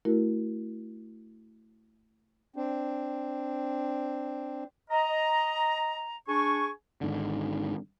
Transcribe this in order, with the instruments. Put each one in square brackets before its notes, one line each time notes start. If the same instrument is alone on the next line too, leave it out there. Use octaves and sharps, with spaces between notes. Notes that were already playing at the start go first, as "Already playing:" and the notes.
[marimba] A3 E4 F#4 A#4
[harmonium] C4 D4
[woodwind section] D#5 A#5
D4 G#4 G#5 C#6
[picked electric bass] G#1 G#2 D3